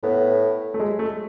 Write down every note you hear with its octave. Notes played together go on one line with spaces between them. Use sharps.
A2 B3
A3
G#3
A3